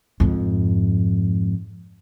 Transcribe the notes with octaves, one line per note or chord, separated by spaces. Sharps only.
F2 G#2